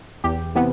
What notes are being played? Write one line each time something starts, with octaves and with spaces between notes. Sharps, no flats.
E2 G4
C3 E3 B3